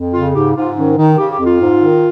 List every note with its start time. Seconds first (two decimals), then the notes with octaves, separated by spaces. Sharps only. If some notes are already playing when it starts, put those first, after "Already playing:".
Already playing: F2
0.14 C#3 F4
0.35 G#2 G4
0.56 G#2 F4
0.77 D#3 C#4
0.97 D#3 D#4
1.18 C#3 G4
1.32 G4
1.39 F2
1.46 F4
1.61 G#2
1.80 D#3